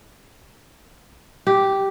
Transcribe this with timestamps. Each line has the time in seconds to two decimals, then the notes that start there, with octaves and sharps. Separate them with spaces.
1.47 G4